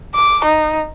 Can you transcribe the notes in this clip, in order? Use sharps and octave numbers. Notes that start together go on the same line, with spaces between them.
D6
D#4